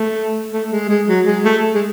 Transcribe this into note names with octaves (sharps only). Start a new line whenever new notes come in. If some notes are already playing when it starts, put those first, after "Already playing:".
Already playing: A3
A3
G#3
G#3
F#3
G#3
A3
G#3